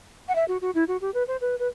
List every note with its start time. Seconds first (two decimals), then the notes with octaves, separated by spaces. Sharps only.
0.28 F#5
0.35 E5
0.48 F#4
0.61 F#4
0.75 E4
0.88 F#4
1.01 G4
1.14 B4
1.27 C5
1.41 B4
1.59 B4